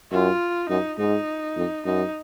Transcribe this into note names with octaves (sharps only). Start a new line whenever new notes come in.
F#2 F4
F#2 D#4
G#2 D#4
F2
F#2 D#4